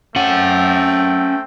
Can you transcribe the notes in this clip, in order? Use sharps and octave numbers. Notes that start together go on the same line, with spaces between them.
A3 C4 C#4 F#5 G5